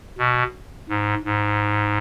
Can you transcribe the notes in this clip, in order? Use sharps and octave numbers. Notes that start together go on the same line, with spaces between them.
B2
G#2
G#2